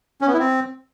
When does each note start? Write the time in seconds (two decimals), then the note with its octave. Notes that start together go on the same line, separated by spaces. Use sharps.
0.21 C#4
0.27 B3
0.33 E4
0.39 C4